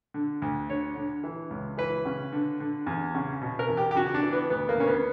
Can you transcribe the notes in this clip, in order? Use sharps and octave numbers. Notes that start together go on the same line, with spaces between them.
D3
D2
D3 C#5
D3
E3
C#2
E3 B4
C#3
D3
D3
E2
C#3
B2
A#4
E2
G4
G4
C#3 F#4
D4
E3
B3
D2 B3
A#3
D2 C#4
B3